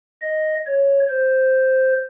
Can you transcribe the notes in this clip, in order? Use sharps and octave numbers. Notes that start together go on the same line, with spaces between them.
D#5
C#5
C5